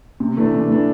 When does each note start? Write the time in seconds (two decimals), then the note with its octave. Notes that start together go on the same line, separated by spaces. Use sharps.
0.20 C3
0.37 E3 A3 D4
0.54 C3
0.70 E3 A3 D4